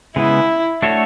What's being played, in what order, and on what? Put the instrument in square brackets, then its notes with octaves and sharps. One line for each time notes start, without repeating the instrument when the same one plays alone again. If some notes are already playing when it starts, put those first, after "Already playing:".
[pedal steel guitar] C#3 G#3 B3 [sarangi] E4
[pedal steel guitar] A3 D4 F#4 A4 C#5